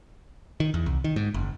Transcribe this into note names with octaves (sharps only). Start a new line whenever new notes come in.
D#3
E2
C2
D#3
G#2
F#1